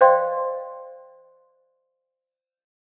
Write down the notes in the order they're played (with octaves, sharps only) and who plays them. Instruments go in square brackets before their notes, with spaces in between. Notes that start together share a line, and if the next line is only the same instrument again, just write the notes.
[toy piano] C5 D5 D#5 F5 G5 C6